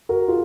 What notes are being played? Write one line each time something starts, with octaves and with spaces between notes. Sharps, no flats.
F#4 A#4
F4 G#4